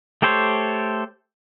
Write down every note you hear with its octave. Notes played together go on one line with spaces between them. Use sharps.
A3 G4 A4 C5 C#5